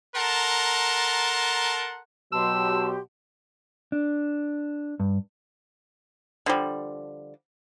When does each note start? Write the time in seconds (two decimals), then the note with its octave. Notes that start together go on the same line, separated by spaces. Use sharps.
0.15 A4 A#4 F#5 A5 A#5 C6
2.32 B2 F#3 G4 A5 C6 E6
3.92 D4
5.00 G2
6.46 D3 F3 G3